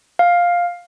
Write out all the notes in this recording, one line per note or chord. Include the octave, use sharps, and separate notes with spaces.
F5